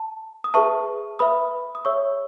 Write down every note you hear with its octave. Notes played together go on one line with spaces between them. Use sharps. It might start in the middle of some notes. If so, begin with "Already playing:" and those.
Already playing: A5
D#6
G#4 B4 E5 A5 C#6
B4 E5 B5 D#6
D#6
G#4 C#5 E5 C#6 E6